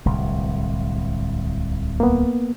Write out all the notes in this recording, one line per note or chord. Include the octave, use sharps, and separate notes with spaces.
D1 C2
A#3 B3